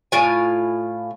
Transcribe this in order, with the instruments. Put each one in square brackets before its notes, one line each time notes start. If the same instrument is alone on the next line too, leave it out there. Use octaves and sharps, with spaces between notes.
[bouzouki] A2 F4 G#5